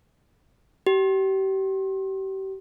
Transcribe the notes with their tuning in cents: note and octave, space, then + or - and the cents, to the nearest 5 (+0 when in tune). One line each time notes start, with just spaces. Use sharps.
G4 -35